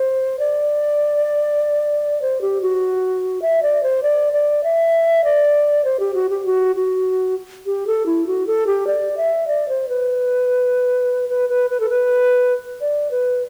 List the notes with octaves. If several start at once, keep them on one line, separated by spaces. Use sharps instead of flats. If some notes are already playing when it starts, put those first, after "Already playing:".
Already playing: C5
D5
C5
G4
F#4
E5
D5
C5
D5
D5
E5
D5
C5
G4
F#4
G4
F#4
F#4
G4
A4
E4
F#4
A4
G4
D5
E5
D5
C5
B4
B4
B4
B4
A4
B4
D5
B4